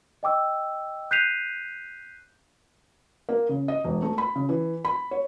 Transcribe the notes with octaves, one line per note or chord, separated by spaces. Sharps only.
D#5 G5 D6 E6
F#6 G6 B6 C7 D#7 F7
A#3
C#3
D#5
E1
A3
B5
C#3
E3
B5
C#5